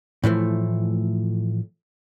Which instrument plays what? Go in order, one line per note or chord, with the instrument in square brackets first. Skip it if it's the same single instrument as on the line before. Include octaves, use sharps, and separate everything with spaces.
[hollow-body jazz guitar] A2 E3 F3 A3